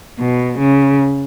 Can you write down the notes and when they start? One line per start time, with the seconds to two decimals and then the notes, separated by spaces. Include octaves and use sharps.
0.19 B2
0.59 C#3